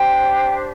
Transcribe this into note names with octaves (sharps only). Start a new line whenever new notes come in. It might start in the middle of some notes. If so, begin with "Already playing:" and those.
Already playing: D4 G4 C5 G5